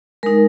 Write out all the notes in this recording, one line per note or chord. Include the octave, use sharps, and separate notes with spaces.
G#3 D#4 A#4